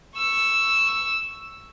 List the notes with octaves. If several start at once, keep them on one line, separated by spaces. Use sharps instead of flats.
C#6 E6